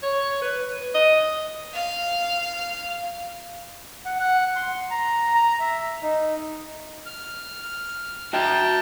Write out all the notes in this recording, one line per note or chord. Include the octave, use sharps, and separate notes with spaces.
C#5
B4
D#5
F5
F#5
F#5
C6
A#5
A#5
E5
D#4
F6
F#4 E5 G5 A5